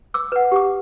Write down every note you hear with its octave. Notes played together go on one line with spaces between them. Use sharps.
D6 E6
B4 F#5
G4 D6